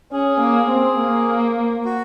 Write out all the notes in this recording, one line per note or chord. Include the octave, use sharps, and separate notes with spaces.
C#4 G#4
A#3
C4
A#3
F#4